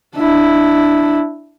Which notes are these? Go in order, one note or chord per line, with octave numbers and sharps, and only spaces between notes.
D4 E4